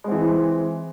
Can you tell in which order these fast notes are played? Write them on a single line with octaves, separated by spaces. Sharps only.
G#3 C4 E3